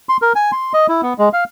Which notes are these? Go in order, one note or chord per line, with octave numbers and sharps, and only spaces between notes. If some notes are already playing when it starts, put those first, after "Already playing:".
C6
A#4
G#5
C6
D#5
E4
B3
G#3
F5